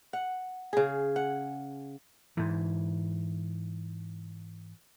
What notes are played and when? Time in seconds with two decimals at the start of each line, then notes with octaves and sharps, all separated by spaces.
0.13 F#5
0.73 C#3 G#4
1.16 F#5
2.37 G#2 E3